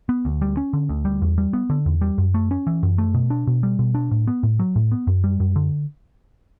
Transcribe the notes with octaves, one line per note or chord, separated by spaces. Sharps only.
B3
D2
G3
C#4
D3
D2
G3
E2
G3
B3
D3
E2
G3
F#2
A3
C#4
E3
F#2
A3
B2
D4
B2
G3
B2
D4
A2
B3
A2
F#3
A2
B3
F#2
G3
F#2
D3